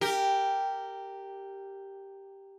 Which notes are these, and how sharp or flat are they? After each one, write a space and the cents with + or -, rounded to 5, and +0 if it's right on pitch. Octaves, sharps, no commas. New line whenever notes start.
G4 +0 A#4 -15